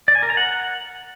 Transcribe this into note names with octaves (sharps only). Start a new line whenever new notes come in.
D5
G#5
A#4
A#5
F#5